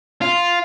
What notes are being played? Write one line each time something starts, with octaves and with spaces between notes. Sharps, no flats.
F4